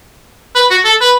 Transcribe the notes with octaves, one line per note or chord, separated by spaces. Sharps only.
B4
F#4
A4
B4